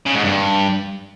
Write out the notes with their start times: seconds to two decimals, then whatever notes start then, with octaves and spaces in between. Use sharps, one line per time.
0.06 C#3
0.15 G#2
0.24 G2